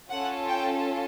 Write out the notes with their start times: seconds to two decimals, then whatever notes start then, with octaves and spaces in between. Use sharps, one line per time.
0.10 C#4 F4 A4 F#5
0.48 G5